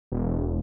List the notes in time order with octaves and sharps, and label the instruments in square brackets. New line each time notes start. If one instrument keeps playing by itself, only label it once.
[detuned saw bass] E1